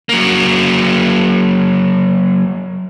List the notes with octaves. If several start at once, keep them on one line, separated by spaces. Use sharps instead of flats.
F#3 A#3